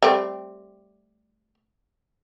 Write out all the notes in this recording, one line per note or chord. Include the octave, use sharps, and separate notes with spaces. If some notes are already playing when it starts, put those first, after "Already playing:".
G3 A3 C4